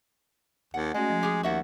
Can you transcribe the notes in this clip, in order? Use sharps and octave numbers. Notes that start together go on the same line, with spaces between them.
D#2 F#5
G#3 A3 C#4 F#4 D#5
F3
G4 G#4
D#2 F#4 E5 F#5